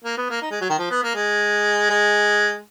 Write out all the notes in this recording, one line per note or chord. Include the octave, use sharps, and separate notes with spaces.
A#3
B3
A#3
D#4
G#3
F#3
D#3
F3
B3
A#3
G#3
G#3